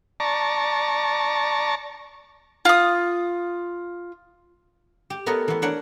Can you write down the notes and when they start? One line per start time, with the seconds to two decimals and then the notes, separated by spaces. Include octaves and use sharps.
0.20 D5 A5 A#5 C#6
2.65 F4 D#6
5.10 G4
5.26 A3 B3 A#4 B4 C#5 D#5
5.48 E3 B3
5.62 D4 A#4 C#5 F#5